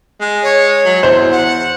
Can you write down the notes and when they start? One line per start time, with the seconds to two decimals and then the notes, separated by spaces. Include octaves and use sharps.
0.21 G#3
0.43 C#5
0.85 F#3
1.03 E2 C5
1.32 F#5